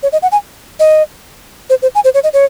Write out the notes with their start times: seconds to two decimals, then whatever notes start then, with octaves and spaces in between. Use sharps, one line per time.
0.03 C#5
0.12 D#5
0.22 F#5
0.32 G#5
0.80 D#5
1.70 C5
1.82 C5
1.95 G#5
2.04 C5
2.14 C#5
2.24 D#5
2.33 C#5